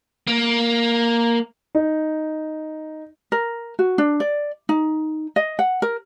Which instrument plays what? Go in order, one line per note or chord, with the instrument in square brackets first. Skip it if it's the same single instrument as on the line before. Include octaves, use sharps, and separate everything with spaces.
[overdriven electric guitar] A#3
[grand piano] D#4
[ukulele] A#4
F#4
D4
D5
D#4
D#5
F#5
A#4